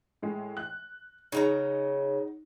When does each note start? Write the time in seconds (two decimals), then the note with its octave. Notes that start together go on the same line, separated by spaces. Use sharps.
0.22 A2 G#3
0.57 F#6
1.32 C#3 F#3 D#4 A#5